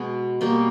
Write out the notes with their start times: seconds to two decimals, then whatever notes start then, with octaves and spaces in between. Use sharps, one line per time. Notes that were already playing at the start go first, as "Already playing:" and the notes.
Already playing: B2 G#3 B3
0.41 B2 G3 A#3